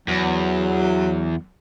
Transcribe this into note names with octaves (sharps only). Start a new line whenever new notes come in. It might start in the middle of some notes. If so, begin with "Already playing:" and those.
E2 F#3